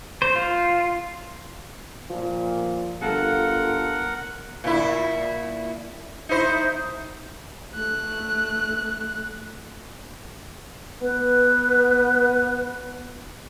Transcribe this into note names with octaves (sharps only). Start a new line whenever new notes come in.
C5
F4
A#2 F3
G1 F4 A4 A#4 F#5
A#2 E4
D#4 E4 C5
A3 F#6
B3 B4